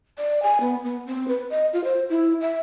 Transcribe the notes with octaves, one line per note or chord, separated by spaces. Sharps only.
D5
G#5
B3
B3
C4
B4
D#5
F4
C5
E4
E5